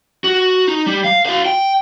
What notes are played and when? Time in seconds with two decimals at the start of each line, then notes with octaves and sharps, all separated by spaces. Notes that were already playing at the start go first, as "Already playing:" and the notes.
0.24 F#4
0.68 D#4
0.86 G3
1.04 F5
1.26 F#4 F5
1.45 G5